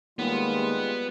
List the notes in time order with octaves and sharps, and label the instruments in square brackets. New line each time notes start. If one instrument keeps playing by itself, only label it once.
[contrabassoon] D#2 [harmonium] G3 G#3 F4 [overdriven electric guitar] B3